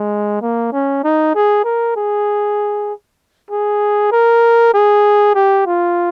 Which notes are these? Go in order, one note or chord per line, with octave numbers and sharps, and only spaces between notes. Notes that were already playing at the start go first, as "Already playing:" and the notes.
Already playing: G#3
A#3
C#4
D#4
G#4
A#4
G#4
G#4
A#4
G#4
G4
F4